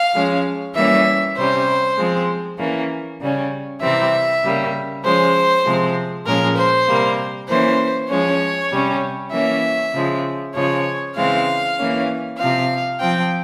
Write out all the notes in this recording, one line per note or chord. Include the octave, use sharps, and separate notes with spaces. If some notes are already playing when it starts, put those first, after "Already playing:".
Already playing: F5
F3 G#3 C#4
E3 G3 A#3 C#4 E5
C3 G3 C#4 C5
F3 G#3 C4
E3 A#3 C#4
C#3 G3 C#4
C3 E3 G3 C4 E5
C#3 G3 A#3
F3 G#3 C#4 C5
C3 F3 G#3 C4
A#2 F3 G#3 C#4 A#4
C5
C3 G3 A#3
E3 A#3 C#4 C5
F3 G#3 C#4 C#5
C3 G3 C#4
E3 A#3 C#4 E5
C#3 F3 G#3
C#3 F3 G#3 C#5
C#3 E3 G#3 C4 F5
E3 A#3 C#4
C3 F3 C4 F5
F3 C4 G5